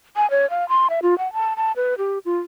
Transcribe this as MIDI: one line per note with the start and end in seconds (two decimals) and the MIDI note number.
0.16 0.29 80
0.31 0.49 73
0.50 0.68 77
0.69 0.88 84
0.90 1.00 76
1.02 1.17 65
1.18 1.32 78
1.33 1.53 81
1.57 1.72 81
1.76 1.95 71
1.98 2.18 67
2.25 2.39 65